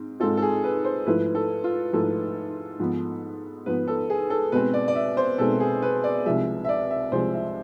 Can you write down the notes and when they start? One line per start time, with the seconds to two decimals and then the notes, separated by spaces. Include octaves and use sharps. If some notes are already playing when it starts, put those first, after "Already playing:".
Already playing: G#2 C4
0.20 G#2 G#3 C4 F4 A4
0.37 A4
0.42 G#4
0.64 B4
0.85 C5
1.06 G#2 F3 A3 E4 B4
1.35 A4
1.64 F4
1.93 G#2 F3 A3 E4 A4
2.80 G#2 F3 B3
3.66 G#2 F3 B3 B4
3.88 A4
4.10 G#4
4.30 A4
4.52 B2 G#3 C4 B4
4.74 D5
4.88 D5
4.95 E5
5.17 C5
5.38 B2 G#3 C4 A4
5.60 G#4
5.82 B4
6.04 D5
6.25 C2 C3 F3 G#3 E5
6.64 E5
6.69 D5
6.90 E5
7.12 C2 C3 F3 G#3 C5
7.33 E5